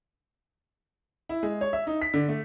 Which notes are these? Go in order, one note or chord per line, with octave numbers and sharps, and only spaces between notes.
E4
G#3
C#5
E5
D#4
B6
D3
A3